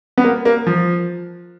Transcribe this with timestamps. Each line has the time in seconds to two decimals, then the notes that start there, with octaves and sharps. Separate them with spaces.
0.18 B3
0.24 A#3
0.45 A#3
0.67 F3